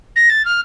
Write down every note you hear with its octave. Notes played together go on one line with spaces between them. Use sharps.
A#6
A6
F6